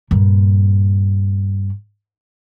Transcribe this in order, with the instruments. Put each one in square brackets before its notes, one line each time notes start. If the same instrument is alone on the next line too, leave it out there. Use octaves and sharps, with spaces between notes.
[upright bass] G2 A#2